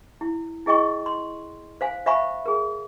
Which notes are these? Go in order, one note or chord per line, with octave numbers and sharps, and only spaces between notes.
E4
E4 G#4 D#5 G5 C#6
C6
C5 F5 G#5
C5 E5 F5 G#5 B5 C#6
G#4 A#4